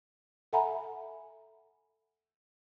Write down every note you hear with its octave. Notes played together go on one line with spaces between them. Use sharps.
A4 E5 F#5 G#5 A#5 B5